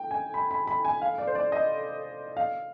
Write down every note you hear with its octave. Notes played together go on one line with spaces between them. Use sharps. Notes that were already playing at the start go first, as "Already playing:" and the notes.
Already playing: G5
G#5
B5
B5
B5
G#5
F5
D5
C5
D5
D#5
F5